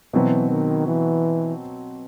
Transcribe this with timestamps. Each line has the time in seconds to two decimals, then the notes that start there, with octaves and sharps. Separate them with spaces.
0.13 B2 E3 F#3 C4 F#4 B4
0.50 D#3
0.88 E3